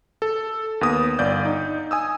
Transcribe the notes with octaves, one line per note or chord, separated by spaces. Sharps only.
A4
D#2 B3 D#6
G1 D5 F5 G6
D#4
G#5 D#6 E6